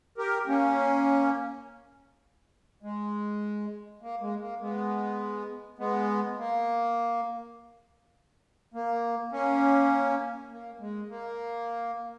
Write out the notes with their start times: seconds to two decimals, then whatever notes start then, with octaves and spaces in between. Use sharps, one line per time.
0.18 G4 A#4
0.47 A#3 C#4
2.83 G#3
4.02 A#3
4.21 G#3
4.41 A#3
4.60 G#3 B3
5.79 G#3 B3
6.38 A#3
8.74 A#3
9.32 A#3 C#4
10.50 A#3
10.80 G#3
11.09 A#3